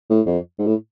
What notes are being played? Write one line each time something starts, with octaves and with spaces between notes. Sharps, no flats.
A2
F2
G#2
A2